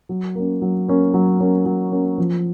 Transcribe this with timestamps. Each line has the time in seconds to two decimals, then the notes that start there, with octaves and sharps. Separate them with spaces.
0.09 F#3
0.35 A#3 C#4
0.62 F#3
0.88 A#3 C#4
1.14 F#3
1.40 A#3 C#4
1.66 F#3
1.92 A#3 C#4
2.18 F3